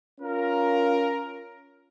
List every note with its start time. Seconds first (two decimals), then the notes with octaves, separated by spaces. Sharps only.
0.21 C#4 F4 A#4